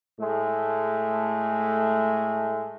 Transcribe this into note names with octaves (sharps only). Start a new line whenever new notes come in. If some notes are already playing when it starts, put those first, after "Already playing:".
A2 G#3 A3